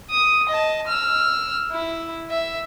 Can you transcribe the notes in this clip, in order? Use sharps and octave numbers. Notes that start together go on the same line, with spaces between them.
D#6
D#5 A5
E6 F6
E4
E5